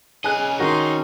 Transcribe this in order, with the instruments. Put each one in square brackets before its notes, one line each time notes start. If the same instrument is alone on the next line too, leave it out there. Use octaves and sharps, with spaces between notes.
[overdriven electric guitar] C#4 D#5 [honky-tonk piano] G#4 G#5 F#6
[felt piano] D#3 F#4 A#4 [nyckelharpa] D#4 C6